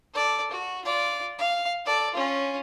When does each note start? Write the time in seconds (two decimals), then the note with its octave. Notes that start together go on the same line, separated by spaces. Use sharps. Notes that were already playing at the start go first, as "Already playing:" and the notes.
0.14 A4 D5
0.51 F#4
0.85 F4 D5
1.39 F5
1.85 A4 D5
2.14 C#4 F4